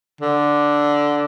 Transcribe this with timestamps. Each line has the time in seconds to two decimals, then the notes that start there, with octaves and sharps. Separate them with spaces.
0.21 D3